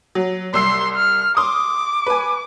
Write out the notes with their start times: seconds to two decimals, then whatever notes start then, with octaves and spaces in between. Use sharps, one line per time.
0.15 F#3
0.54 C2 C6 E6 C7
0.96 F6
1.37 C6 D6 D#6
2.06 B4 G#5